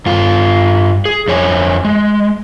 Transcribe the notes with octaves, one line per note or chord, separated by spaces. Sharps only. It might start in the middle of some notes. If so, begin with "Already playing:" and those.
G2 F4
G#4
F2 C#5 G#5
G#3